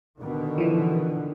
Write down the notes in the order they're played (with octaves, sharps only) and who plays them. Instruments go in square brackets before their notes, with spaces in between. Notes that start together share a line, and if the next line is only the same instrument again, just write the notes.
[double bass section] B2 D3 D#3
[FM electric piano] E3 F3